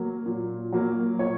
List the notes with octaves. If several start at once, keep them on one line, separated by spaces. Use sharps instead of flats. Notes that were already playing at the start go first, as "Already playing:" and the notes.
Already playing: F#3 A#3
A#2
F#3 A#3
A#2 C#5